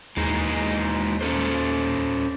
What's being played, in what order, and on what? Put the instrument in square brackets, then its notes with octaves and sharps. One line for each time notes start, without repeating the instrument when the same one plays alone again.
[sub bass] D#2 [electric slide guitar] E3 G#3 D#4
[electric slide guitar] C#4 A4 C5